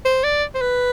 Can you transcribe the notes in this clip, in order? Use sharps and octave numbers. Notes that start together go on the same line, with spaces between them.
C5
D5
C5
B4